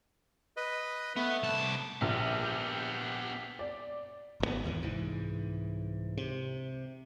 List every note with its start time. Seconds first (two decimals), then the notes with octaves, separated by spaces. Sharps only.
0.57 B4 D#5
1.16 A3 B3
1.43 C2 A5
2.01 A#1 B3 G4
3.59 D5
4.40 G#1 B2 B3
4.64 G#1 E2 B2 E3
4.82 C2 G#2 E3
6.18 C3